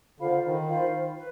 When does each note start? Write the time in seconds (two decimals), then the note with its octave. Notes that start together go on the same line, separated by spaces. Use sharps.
0.20 D3 F4 C5 F5 B5
0.43 D#3
0.68 F4 C5 F5 B5
1.16 B4